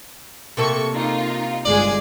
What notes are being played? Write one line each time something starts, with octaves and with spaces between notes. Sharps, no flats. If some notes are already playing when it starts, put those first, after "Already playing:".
C3 A#3 A4 C#6
D#4 F4
G1 G#3 G#4 D5